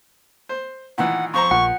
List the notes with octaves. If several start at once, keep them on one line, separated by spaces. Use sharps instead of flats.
C5
A#2 D#3 E3 F#5
F2 C5 A#5 C#6
A#1 F3 F#5